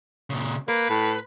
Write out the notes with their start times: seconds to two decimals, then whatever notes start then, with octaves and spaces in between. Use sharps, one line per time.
0.30 A#2 C#3
0.68 A#3 B4
0.90 A2